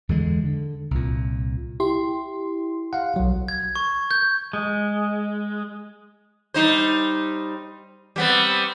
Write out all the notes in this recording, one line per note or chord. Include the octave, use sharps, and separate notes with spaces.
E2 D3 G#3
D3
C2 A#2
E4 G4 C6
F5 F#5
B1 F#3
G#6
C#6
G6
G#3
G3 D#4 C5
G3 B3 C4